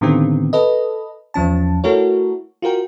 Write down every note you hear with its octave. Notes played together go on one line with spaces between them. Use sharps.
A2 D3 D#3 B3 C4 G4
A4 B4 D#5
E2 F3 C#4 A5
A3 E4 F#4 A4 A#4 C#5
F4 F#4 A#4 G5